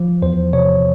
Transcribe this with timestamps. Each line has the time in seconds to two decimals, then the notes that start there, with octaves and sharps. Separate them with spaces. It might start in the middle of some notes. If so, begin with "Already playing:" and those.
Already playing: F3
0.22 E2 C5
0.53 C3 C#5